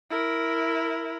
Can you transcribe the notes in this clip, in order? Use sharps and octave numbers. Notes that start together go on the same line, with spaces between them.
E4 A#4